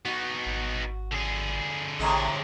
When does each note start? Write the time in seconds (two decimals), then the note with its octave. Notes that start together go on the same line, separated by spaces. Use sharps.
0.05 B3 D#4 F#4
0.46 G#1
1.12 D3 G#4
1.99 A1 A2 C3 G#3